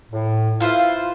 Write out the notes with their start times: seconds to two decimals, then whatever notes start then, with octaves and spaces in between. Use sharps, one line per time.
0.11 A2
0.60 E4 F4 B4 C5 F5